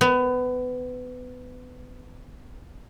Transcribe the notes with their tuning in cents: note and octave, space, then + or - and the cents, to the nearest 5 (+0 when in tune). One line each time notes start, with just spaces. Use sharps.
B3 +25